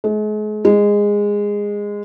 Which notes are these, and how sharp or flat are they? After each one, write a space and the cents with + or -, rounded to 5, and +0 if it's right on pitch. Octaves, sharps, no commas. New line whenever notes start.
G#3 +40
G#3 -15